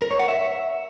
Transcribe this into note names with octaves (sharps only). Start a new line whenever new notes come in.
A#4
C#5
F#5
E5